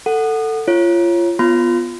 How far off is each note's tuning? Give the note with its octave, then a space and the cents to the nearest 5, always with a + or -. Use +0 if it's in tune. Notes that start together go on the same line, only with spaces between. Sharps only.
A4 +15 F#5 +0
F4 -25 C#5 -20
B3 +0 F4 -5 C6 -45